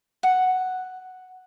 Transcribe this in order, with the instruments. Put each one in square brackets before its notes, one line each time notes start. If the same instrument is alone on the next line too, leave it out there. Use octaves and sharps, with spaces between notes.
[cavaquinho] F#5